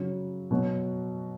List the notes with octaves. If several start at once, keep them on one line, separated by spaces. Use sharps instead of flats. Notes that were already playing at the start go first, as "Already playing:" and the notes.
Already playing: C#3 F#3
B2 F#3